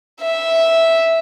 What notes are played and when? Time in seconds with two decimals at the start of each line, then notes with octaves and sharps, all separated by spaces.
0.21 E5